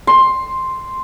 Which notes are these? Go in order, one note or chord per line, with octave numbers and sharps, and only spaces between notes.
C6